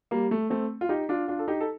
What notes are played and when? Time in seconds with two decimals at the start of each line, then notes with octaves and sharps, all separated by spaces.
0.11 G3 A#3
0.31 A3
0.50 A3 C4
0.81 F4
0.89 D#4 G4
1.09 D4 F4
1.28 D4 F4
1.39 A4
1.48 D#4 G4
1.61 A4